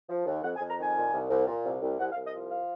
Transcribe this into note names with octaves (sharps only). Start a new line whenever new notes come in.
F3
D#2
F2 F#5
G#5
F2
A#5
D#3 G#5
A#2
C2
C2
A#2
C2
C2
C2 F#5
F5
C2
D#5
F3
F5